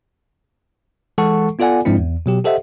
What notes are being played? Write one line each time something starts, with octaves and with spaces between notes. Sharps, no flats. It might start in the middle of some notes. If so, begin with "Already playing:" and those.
E3 G#3 A4 F#5 A5 C#6
B3 F4 A4 D5 F#5 G#5
G#2 F3 G#3 C4 D4 E4
E2
B2 F#3 G4
G4 A4 C5 D#5 E5 F#5